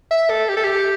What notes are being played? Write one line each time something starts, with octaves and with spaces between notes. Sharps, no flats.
E5
A4
G4
A4
G4